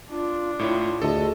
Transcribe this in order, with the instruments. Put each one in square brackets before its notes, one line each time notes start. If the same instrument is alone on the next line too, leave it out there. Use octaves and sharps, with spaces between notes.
[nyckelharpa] D4 [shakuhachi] F4
[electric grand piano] A2 E4 C#5 [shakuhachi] F4
[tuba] D2 [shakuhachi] G#4 [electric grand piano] A4 D#5 A5